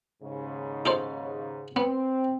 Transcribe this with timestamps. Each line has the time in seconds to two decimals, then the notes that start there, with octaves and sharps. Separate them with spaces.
0.23 D#2 G#2 C#3
0.86 D#4 A4 C5
1.76 B3 C4